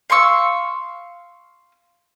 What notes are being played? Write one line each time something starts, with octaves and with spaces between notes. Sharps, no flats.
F5 C6 C#6 E6